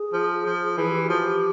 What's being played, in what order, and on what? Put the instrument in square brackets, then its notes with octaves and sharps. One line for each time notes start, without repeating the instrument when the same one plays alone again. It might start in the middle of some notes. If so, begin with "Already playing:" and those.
Already playing: [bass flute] G#4
[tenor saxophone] F3
F3
[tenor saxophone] E3 [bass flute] G#4
[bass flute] G4
F#4
[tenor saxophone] F3
[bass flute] G4